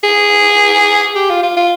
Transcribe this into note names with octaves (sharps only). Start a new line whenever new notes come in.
G#4
G4
F4
F4
F4